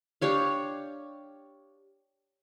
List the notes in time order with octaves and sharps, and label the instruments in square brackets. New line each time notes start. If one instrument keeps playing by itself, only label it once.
[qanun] D4 G4 C#5 F5